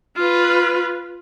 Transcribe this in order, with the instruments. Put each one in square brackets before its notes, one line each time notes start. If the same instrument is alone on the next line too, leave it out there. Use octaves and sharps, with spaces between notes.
[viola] F4 B4